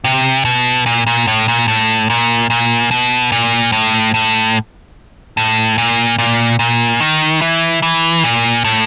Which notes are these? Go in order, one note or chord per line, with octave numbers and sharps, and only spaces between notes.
C3
B2
A#2
A#2
A2
A#2
A2
A#2
A#2
B2
A#2
A2
A2
A2
A#2
A#2
A#2
D#3
E3
E3
A#2
A2